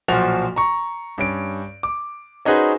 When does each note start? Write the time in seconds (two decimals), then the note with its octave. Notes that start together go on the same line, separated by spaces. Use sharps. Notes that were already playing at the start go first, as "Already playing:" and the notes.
0.08 B1 A#2 F3 F#4 F7
0.56 A#5 C#6
1.18 G2 C#4 D7
1.83 D6
2.45 C#4 D#4 F#4 G#4 B4 C5